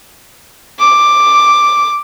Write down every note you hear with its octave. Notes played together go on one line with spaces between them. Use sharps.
D6